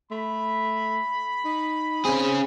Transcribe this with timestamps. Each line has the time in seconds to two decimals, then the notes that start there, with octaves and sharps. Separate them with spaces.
0.11 A3 B5
1.45 D#4
2.05 C4 C#4 G#4